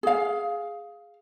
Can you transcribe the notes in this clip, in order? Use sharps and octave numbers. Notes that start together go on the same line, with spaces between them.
G#4 F5